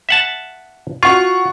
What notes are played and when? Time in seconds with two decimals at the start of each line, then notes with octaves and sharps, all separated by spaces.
0.09 E5 F#5 A5
1.03 F4 F#4 C#6